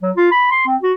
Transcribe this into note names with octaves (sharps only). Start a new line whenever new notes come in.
F#3
F4
B5
C6
C4
F#4